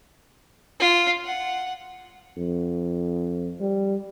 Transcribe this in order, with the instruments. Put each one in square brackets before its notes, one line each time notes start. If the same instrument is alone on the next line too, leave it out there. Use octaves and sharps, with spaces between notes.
[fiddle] F4
F#5
[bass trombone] F2
G3